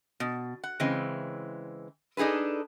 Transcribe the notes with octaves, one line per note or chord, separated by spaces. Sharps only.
B2
F#5
C#3 E3 G#3 C4
D4 D#4 G#4 A4 B4